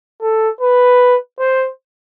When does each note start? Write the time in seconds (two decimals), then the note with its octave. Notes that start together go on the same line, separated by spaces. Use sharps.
0.22 A4
0.61 B4
1.39 C5